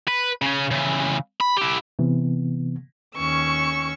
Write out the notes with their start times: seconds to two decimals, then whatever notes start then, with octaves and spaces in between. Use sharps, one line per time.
0.08 B4
0.42 C#3 C#4
0.71 C#3 E3
1.40 B5
1.57 E4 G4
1.99 C3 E3 B3
3.16 D#2 C#4 C#6 E6